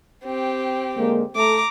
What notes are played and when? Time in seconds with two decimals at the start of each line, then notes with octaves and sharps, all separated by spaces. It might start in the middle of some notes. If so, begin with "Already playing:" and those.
0.24 C4 G4
0.96 D3 G#3 A#3
1.36 A3 A#5 D6